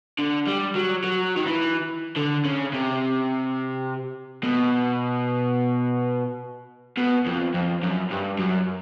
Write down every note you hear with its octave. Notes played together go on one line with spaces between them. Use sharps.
D3
G3
F#3
F#3
D#3
E3
D3
C#3
C3
B2
B2
F2
F2
F#2
G2
F#2